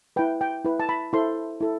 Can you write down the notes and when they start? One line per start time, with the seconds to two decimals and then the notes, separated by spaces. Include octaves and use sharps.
0.16 E4 B4 G5
0.41 G5
0.65 E4 B4
0.80 A5
0.89 B5
1.13 E4 A4 C5 C6
1.60 E4 A4